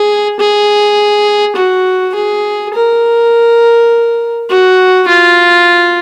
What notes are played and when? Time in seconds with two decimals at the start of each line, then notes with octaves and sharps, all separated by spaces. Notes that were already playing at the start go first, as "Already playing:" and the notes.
Already playing: G#4
0.40 G#4
1.56 F#4
2.15 G#4
2.74 A#4
4.49 F#4
5.08 F4